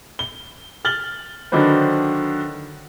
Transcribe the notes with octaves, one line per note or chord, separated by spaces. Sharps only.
G7
F6 A6 F#7 G7
D3 D#3 F#3 D4 B4 C5